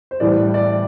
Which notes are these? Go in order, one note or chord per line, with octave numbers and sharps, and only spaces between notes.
C5
A2 E3 G3 D5
D5